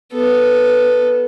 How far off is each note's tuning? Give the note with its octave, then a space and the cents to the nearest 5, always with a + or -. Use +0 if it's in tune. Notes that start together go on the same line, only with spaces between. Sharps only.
B3 +0 A4 +0